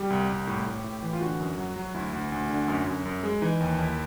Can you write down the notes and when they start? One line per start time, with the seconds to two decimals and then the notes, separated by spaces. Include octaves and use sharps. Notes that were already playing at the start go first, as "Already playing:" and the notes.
Already playing: G3 G4
0.10 C2
0.29 C2
0.47 A2
0.66 A2
0.84 A2
1.02 E3
1.13 F4
1.21 D3 F#4
1.39 F#2
1.58 F#3
1.76 F#3
1.94 D2 E4
2.13 D2
2.32 D2
2.50 D3
2.68 F#2
2.86 F#2
3.05 F#2
3.23 G#3
3.42 E3 D#4
3.60 D#2
3.78 D#2 E4